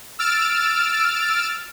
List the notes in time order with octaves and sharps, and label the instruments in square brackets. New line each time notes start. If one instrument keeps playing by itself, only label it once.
[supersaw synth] E6 F6 A6 D7